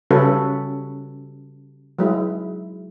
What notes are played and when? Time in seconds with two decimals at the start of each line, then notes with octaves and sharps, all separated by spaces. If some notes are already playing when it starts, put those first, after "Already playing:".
0.11 C#3 G3 C#4 F#4 A4 B4
1.99 F#3 G#3 E4